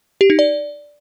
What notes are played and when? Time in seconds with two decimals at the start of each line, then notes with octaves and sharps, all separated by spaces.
0.21 G4
0.30 D#4
0.39 D5